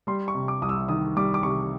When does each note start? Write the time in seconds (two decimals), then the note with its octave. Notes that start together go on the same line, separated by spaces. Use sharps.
0.07 G3 C6
0.28 C#6
0.35 C3
0.48 D6
0.62 C2 D#6
0.69 E6
0.89 D#3 D#6
1.16 G3 D6
1.34 D6
1.43 C3 C#6